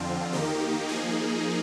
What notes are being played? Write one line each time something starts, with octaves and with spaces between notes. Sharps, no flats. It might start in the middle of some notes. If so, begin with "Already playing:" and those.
Already playing: F2 D3 F3 C4 F4
D#3 A#3 D#4 G4
F3 A#3 D#4 G#4